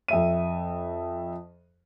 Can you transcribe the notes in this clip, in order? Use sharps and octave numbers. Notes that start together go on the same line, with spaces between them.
F2 E5 D#7